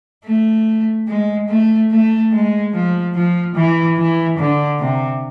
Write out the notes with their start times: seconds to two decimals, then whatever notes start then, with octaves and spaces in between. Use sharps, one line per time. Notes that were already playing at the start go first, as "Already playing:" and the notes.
0.25 A3
1.08 G#3
1.49 A3
1.91 A3
2.32 G#3
2.73 F3
3.15 F3
3.55 E3
3.97 E3
4.38 D3
4.80 C3